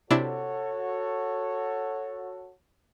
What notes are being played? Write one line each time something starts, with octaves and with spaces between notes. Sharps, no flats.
C3 D4 E4 F#4 A4 C#5